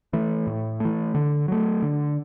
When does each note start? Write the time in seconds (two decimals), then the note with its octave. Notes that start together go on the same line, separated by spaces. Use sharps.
0.13 E3 A3
0.47 A2
0.80 E3 A3
1.15 D3
1.48 F#3 A3
1.82 D3